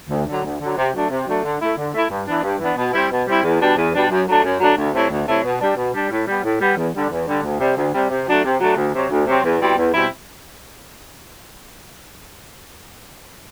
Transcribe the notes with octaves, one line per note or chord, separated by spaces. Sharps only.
D2
D3 F#3
D2
D3 F#3
C3
F#3 A3 D4
C3
F#3 A3 D4
D3
A3 E4
D3
A3 E4
G2
E3 B3 D4
G2
E3 B3 D4
B2
G3 C4 E4
B2
G3 C4 E4
E2
B2 G3 D4
E2
B2 G3 D4
F#2
F#3 A3 D4
F#2
F#3 A3 D4
D2
C3 F#3 A3 E4
D2
C3 F#3 A3 E4
B2
G3 D4
B2
G3 D4
A2
G3 B3
A2
G3 B3
E2
D3 G3
E2
D3 G3
D2
C3 G3
D2
C3 G3
C3
F#3 A3 D4
C3
F#3 A3 D4
D2
C3 F#3 C4
D2
C3 F#3 C4
E2
B2 G3 C4 E4
E2
B2 G3 C4 E4